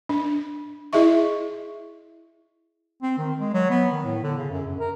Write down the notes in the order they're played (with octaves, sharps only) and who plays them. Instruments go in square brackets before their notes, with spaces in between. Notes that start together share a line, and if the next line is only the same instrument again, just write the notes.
[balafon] D4
E4 G#4 D#5 E5 C#6
[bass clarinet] C4
D#3
G#3
F#3
B3
D#3
A2
D3
C#3
F#2
F#2
A#4